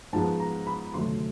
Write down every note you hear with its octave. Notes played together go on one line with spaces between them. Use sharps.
G#2 F3 G#3 B3 A5
A#5
B5
D2 C3 D#3 F#3 A3 C6